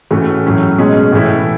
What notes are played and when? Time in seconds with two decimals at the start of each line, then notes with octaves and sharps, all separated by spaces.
0.11 A2 E3 A3 C#4 F#4
0.44 A2 F#3 C#4 F#4
0.79 B2 G#3 C#4 G#4
1.12 A2 E3 A3 E4